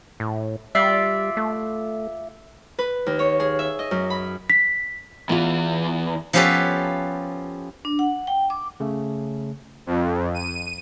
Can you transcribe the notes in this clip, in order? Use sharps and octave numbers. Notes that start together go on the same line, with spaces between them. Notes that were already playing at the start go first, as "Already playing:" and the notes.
A2
G3 F4 D5 E5
A3
B4
D#2
C#5
G#4
E5
D#5
F#2
B5
B6
E2 E3 B3 F4
F3 B3 C#4 G4 A4 B4
D4
F#5
G5
D6
C#3 A3
F2
D#7